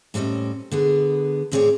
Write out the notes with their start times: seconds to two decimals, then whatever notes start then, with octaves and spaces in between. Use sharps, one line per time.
0.14 A2 G3 C4 C#4 D#5
0.71 D3 B3 G#4
1.52 D2 A2 C4 G#4 C#5 D5